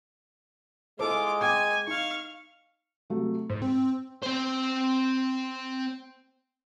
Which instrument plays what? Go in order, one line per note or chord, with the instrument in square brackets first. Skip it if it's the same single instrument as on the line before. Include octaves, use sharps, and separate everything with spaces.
[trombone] G#3 [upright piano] E4 A4 C5 [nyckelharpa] F4 D6
[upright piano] G5 D6 G#6 [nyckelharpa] G#5
[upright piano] D#4 [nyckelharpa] F5 C#6
[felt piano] C3 F#3 A3
[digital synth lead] G#2 [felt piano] C5
[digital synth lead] C4
[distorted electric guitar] C4 C5